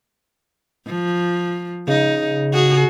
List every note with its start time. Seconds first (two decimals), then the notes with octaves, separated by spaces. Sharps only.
0.87 F3
1.87 C#3 D#4
2.53 F#4 G#4